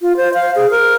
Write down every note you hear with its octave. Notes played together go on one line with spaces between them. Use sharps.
F4
C5
F5
G#4
A#4